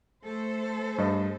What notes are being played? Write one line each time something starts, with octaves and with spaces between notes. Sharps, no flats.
A3 A4 C5
G2 D#5